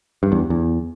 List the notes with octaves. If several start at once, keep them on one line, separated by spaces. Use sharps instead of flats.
G2
E2
E2